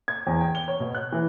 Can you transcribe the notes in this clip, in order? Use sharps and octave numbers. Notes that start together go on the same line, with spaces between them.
G#6
E2
G5
G7
C#5
B2
F#6
E3